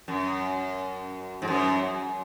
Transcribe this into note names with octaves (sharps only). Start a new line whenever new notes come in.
F#2
G#2
F#2